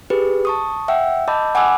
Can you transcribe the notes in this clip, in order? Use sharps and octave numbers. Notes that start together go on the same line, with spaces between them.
G4 G#4 B4
A5 C#6 D#6
E5 F#5 G5 E6
D#5 A5 B5 D6 E6 G6
F#5 G#5 B5 D6 E6 F#6